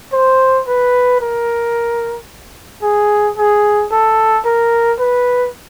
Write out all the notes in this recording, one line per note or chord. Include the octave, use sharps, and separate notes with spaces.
C5
B4
A#4
G#4
G#4
A4
A#4
B4